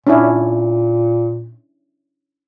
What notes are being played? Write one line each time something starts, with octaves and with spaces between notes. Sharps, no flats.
A#2 C#4 D4 E4